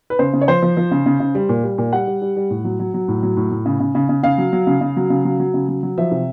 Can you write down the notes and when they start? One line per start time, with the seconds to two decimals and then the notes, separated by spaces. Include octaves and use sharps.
0.10 B4
0.19 C#3 C5
0.33 C#3
0.41 C#5
0.48 F3 C5
0.62 F3
0.77 F3
0.91 C#3
1.06 C#3
1.20 C#3
1.35 G3
1.49 A#2
1.64 G3
1.78 A#2
1.93 G3 F#5
2.07 G3
2.22 G3
2.36 G3
2.50 A2
2.64 F#3
2.79 F#3
2.94 F#3
3.08 A2
3.23 F#3
3.37 A2
3.51 A2
3.66 C#3
3.80 C#3
3.95 C#3
4.09 C#3
4.23 C#3 F5
4.38 F#3
4.53 F#3
4.67 C#3
4.81 C#3
4.97 F#3
5.10 C#3
5.25 F#3
5.40 F#3
5.54 C#3
5.68 F#3
5.83 F#3
5.98 F3 E5
6.12 C3